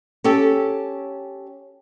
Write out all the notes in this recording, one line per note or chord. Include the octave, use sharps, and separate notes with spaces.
C#4 G4 A4